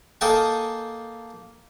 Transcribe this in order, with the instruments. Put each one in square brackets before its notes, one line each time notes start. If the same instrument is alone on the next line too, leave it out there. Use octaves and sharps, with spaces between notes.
[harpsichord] A#3 A4 D#5 G5 G#5